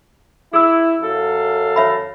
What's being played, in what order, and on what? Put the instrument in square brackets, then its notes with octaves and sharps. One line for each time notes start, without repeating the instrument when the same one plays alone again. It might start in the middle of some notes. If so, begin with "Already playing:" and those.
[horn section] E4 [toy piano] G#4 E6
[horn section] F#2 A4 F5
[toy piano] C#5 E5 B5